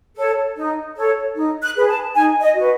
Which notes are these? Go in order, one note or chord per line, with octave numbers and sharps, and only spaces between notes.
A4 C#5
D#4
A4 C#5
D#4
F#6
G#4 B4
A5
D#4 G#5
D#5
F#4 B4